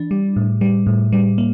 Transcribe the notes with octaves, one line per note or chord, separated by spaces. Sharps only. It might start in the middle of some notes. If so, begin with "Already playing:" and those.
Already playing: E3 D4
G3
A2
G3
A2
G3
A#3